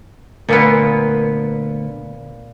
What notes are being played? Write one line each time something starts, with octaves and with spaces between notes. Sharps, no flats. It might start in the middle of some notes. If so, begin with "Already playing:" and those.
D2 A#2 A#3 B3